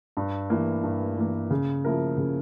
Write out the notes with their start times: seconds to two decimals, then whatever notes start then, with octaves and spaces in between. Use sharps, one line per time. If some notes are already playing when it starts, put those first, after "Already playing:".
0.17 G2
0.50 E3 A#3
0.83 G2
1.17 E3 A#3
1.51 C#3
1.85 F3 A#3 E4 A#4
2.18 C#3